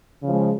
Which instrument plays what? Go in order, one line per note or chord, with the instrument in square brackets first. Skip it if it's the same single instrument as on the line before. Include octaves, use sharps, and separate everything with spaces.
[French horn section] C#3 F3 G#3